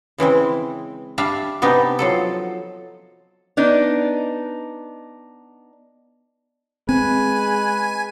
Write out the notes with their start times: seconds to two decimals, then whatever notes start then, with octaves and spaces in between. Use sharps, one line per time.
0.18 C#3 E3 G#3 C4
1.18 G3 D4 E5 F5
1.62 C3 B3 D4 D#4 G4
1.99 F3 F#3 A4
3.57 B3 D4 D#4
6.89 G#3 C4 B4 G#5